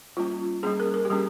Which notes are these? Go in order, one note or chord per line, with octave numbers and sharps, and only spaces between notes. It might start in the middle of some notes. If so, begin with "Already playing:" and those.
G3 A#3 C#4 F4
G3 A#3 C#4 G#4
A#4
A#4
G4
G3 A#3 C#4 G#4